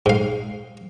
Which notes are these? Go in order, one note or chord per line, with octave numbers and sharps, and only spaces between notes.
G#2 F5